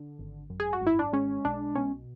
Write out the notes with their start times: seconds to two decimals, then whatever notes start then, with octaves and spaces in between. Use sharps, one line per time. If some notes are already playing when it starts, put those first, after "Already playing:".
Already playing: D3
0.19 G#1
0.50 F#2
0.60 G#4
0.73 F#4
0.81 G#1
0.87 E4
0.99 D4
1.13 G#3 C#4
1.45 B1 D4
1.75 B2 C#4